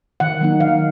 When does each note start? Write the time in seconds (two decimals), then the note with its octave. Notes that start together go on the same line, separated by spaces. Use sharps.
0.20 D#3 F#5
0.41 F#3 A#3 D#4
0.60 D#3 F5